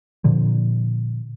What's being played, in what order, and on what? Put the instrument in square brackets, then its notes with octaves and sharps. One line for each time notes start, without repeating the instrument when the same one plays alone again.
[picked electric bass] A#2 D3 F3